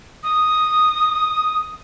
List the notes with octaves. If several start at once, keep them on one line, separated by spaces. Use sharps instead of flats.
D#6